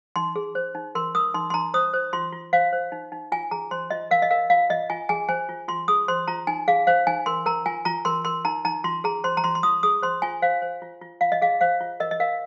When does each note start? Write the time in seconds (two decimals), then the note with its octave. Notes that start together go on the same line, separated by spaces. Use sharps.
0.16 D#4 C6
0.36 G#4
0.55 C5
0.75 D#4
0.95 A#4 C6
1.15 A#4 D#6
1.34 D#4 C6
1.50 C6
1.54 D#4 A#5
1.74 C5 D#6
1.94 C5
2.13 F4 C6
2.32 F4
2.53 C5 F5
2.73 C5
2.92 D#4
3.12 D#4
3.32 F4 G#5
3.51 G#4 A#5
3.71 C5 C6
3.90 F4 D#5
4.11 A#4 F5
4.22 D#5
4.31 A#4 F5
4.50 F4 F5
4.70 F4 D#5
4.90 F4 G#5
5.09 G#4 G#5
5.29 C5 G#5
5.49 F4
5.68 F4 C6
5.88 G#4 D#6
6.08 C5 C6
6.28 F4 A#5
6.47 D#4 G#5
6.68 G#4 F5
6.87 C5 F5
7.07 D#4 G#5
7.26 A#4 C6
7.46 A#4 A#5
7.66 F4 G#5
7.85 F4 A#5
8.05 A#4 C6
8.25 A#4 C6
8.45 D#4 A#5
8.65 D#4 A#5
8.84 F4 C6
9.04 G#4 A#5
9.24 C5 C6
9.37 A#5
9.44 F4 C6
9.55 C6
9.63 F4 D#6
9.83 G#4 D#6
10.02 C5 C6
10.22 F4 G#5
10.42 C5 F5
10.62 C5
10.82 F4
11.01 F4
11.21 F4 F5
11.32 D#5
11.42 G#4 F5
11.61 C5 F5
11.81 F4
12.00 A#4 D#5
12.11 D#5
12.20 A#4 F5